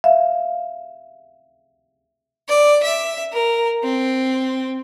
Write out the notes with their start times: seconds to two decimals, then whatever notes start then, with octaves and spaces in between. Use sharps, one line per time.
0.04 E5 F5
2.48 D5
2.83 E5
3.32 A#4
3.83 C4